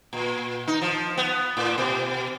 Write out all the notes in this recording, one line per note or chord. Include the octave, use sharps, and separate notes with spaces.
A#2
D#4
F3
B3
A2
B2